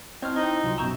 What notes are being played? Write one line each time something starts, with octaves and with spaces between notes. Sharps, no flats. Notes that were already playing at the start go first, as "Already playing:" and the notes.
C4 E4 C5 C#5 D#5 A5 F6
D#4 E4 C5 D#5 G5
C2 F#3 F4
F#2 B2 E5 A#5 C#6 E6 G6